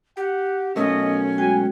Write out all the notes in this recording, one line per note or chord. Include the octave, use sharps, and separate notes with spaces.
G4 F#5
B1 A3 C#4 A#4 D#5
G#3 F#4 G5 G#5